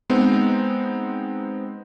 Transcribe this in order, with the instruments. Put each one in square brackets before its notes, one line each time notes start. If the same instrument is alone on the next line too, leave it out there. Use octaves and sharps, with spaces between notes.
[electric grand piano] G#3 B3 C4 D#4